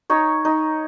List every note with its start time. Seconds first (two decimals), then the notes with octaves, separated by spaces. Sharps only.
0.10 D#4 C#5
0.45 D#4